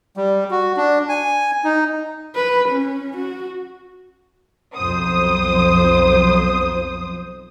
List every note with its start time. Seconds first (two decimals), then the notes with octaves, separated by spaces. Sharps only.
0.17 G3
0.51 F#4
0.77 D4
1.09 G#5
1.64 D#4
2.35 B4
2.68 C#4
3.16 F#4
4.76 B1 F2 C5 D#6